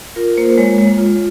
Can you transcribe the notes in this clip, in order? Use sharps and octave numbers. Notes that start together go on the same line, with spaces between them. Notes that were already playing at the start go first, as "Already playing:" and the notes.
F4 A#4
A#3 C5
G#3 C#5
G#3
F4